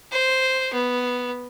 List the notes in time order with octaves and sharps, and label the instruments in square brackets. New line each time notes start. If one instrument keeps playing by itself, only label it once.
[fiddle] C5
B3